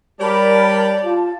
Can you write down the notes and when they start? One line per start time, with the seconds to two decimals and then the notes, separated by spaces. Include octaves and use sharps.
0.20 G3 G4 A#4 C#5 D5 A5 B5
1.04 F4 A5